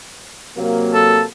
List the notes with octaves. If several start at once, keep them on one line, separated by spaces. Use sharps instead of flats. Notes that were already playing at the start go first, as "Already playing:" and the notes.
C3 F#3 A#3
A4